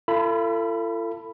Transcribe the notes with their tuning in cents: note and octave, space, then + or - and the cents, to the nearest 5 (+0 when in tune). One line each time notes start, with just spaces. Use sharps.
F4 -45 A4 +30 B5 +0